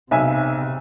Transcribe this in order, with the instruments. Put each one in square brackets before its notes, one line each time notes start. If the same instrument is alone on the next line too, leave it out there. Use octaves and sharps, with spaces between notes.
[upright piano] B1 E5 G#5 [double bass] C3